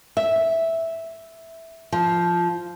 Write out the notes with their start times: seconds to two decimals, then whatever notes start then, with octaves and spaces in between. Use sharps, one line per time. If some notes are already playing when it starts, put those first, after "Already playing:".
0.17 E5
1.92 F3